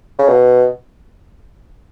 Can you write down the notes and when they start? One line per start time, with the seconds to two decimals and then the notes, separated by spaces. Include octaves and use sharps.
0.19 C#3
0.29 B2